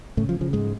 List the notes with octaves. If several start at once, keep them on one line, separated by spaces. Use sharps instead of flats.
A2 C#3 A3
F3
C#3 F3
G#2 G#3